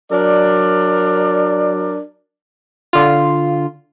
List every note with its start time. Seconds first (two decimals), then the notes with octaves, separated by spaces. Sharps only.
0.11 F#3 D4 A#4 D5
2.93 D3 F4